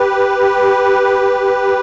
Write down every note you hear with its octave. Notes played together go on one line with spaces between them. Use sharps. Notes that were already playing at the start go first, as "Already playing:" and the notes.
Already playing: G4 B4